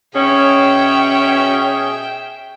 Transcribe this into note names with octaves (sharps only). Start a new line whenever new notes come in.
B2 C#4 G#4 E5 G5